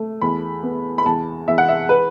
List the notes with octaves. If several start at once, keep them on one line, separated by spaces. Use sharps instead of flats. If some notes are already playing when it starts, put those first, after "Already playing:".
Already playing: A3
E2 B5
B3
B5
E2 A5
E2 E5
F#5
E5
B4